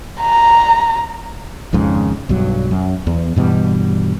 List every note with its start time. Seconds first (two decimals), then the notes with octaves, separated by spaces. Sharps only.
0.21 A#5
1.73 G#1 F2 G#2 C#3
2.29 B1 G2 F#3
2.71 F#2
3.07 E2
3.36 G2 B2 E3 G3